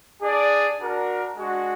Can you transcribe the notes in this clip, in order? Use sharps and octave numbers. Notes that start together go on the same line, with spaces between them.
D4 G#4 D5
D4 F#4 A#4
G#3 D4 F#4